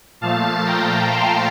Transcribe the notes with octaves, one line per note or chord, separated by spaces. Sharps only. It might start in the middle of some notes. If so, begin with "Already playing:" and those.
A#2 F3 A3 F5 A5
G5 A#5
A5 C6